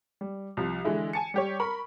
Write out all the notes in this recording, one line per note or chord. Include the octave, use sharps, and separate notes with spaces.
G3
C2 F3
D3 E3 G#3 E4
G#5 A5 C#7
G3 G4 C#5
A#4 B5 C#6